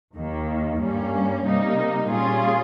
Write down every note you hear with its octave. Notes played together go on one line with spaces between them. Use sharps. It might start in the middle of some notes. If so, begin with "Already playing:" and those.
D#2 D#3 A#3
G2 G3 A#3 C#4
C3 G3 A#3 D#4
A#2 G3 C#4 F4 G#4